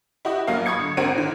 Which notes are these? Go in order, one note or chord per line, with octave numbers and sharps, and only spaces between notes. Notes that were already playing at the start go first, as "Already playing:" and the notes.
E4 F#4 G4 D#5
A1 F#3 A#3 F5
B5 C#6 D#6 G#6 C#7
D3
G#1 C4 F#4 A#4 D7 D#7
D3 D#3